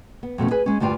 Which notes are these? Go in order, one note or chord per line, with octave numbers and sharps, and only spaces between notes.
B3
F2 B2 A3 C#4
G#4 B4 G#5
G#3 C#4
D2 G2 G3 F4 G5